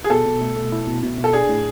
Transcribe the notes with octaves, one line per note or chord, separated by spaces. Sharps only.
G#4
B2 A4
B2
A3
A3
E4
B2
B2
B2
A4
D4 G#4
A2